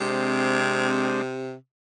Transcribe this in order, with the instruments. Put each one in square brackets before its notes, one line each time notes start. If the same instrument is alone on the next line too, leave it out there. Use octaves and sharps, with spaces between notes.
[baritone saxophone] C3 [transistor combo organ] G#3 C4 D4